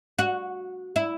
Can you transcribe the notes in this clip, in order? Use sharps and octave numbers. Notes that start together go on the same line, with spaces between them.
F#4
E4